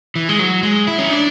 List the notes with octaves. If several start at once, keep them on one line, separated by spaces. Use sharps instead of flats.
E3
G#3
F#3
G#3
E4
C#4
D4